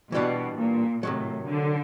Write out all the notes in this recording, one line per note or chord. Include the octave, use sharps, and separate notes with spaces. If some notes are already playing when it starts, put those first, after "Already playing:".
B2 E3 G3 B3 D4 F#4
A#2
A2 C3 D#3 F#3
D3